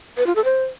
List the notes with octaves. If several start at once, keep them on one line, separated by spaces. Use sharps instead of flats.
B4
F4
A4
C5